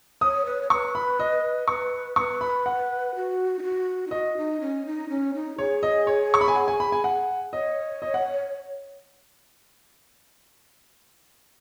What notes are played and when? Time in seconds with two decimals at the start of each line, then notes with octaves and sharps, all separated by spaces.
0.21 C#5 D#6
0.45 B4
0.61 C#5
0.70 B4 C#6
0.95 B5
1.20 D#5
1.68 B4 C#6
2.16 B4 C#6
2.41 B5
2.66 F#5
3.15 F#4
3.58 D#4
3.62 F#4
4.07 D#4
4.11 F#4 D#5
4.37 D#4
4.60 C#4
4.85 D#4
5.09 C#4
5.34 D#4
5.58 G#4 C#5
5.83 D#5
6.07 C#5
6.34 C#6
6.41 B5
6.48 G#5
6.56 F#5
6.68 G#5
6.80 B5
6.92 G#5
7.04 F#5
7.53 C#5 D#5
8.02 D#5
8.14 F#5